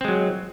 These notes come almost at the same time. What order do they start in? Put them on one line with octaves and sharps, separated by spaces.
C4 G#3 F#3